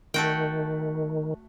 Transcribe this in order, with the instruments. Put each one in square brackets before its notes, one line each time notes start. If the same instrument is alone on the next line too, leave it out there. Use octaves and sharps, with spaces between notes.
[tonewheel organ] D#3 [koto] A3 F#4 G5